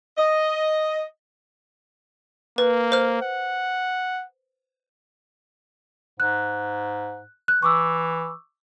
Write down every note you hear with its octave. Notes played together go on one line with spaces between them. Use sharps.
D#5
A#3 B4
C5 F6
F#5
G#2 F#6
F#6
E3 C#6 D6 E6